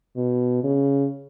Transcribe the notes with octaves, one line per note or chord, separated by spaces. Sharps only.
B2
C#3